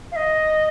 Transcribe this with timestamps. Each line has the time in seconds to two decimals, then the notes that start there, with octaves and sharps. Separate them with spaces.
0.11 F5
0.15 D#5